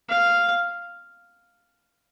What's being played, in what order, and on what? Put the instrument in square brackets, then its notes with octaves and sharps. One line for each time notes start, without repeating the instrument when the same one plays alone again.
[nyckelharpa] F5